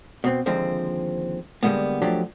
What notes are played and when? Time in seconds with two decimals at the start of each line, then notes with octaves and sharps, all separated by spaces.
0.24 B2 C4
0.46 D#2 D3 F3 G#3 C4
1.63 D3 G3 G#3 A#3 B3
2.02 F3 F#3 A3 D4 G4